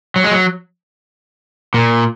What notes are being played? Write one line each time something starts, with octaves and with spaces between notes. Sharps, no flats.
F#3
G#3
F#3
A#2